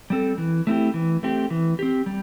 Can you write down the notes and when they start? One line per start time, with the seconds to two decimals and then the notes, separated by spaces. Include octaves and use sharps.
0.10 G3 C4 A4
0.38 E3
0.67 A3 C4 E4 G4
0.94 E3
1.23 A3 C4 G4
1.50 E3
1.79 C4 G4
2.06 G3